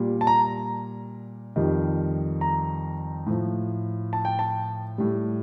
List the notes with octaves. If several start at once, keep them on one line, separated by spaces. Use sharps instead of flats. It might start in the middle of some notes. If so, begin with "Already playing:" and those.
Already playing: A#2 G3
A5
A#5
F2 D#3 G3
A#5
A2 F3
A5
G5
A5
A2 G3